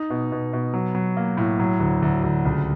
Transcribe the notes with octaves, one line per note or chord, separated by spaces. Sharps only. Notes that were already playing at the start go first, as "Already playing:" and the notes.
Already playing: D#4
B2
B2
B2
F#3
F#3
A#3
A2
F#3
D2
D2
D2
C#2